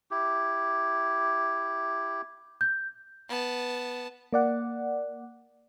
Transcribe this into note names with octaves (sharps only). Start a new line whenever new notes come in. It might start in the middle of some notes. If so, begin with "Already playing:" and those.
E4 G4
G6
B3 A5
A#3 D5 F#5